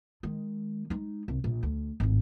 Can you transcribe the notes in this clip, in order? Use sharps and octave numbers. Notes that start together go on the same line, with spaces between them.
D#3 G#3
G#3 D#4
C2
A#1
D2
G#1 A2